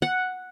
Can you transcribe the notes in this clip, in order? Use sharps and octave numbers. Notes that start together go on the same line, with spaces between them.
F#5